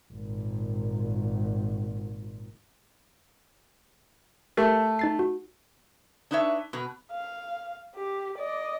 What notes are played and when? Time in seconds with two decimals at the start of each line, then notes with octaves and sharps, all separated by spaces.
0.13 G#1 A#2
4.57 A3 G4 A#4
4.99 D#4 A6 C7
5.19 F#4
6.31 D4 D#4 B4 C#5 E5
6.73 B2 B4 A#5
7.12 F5
7.96 G4
8.38 D5 D#5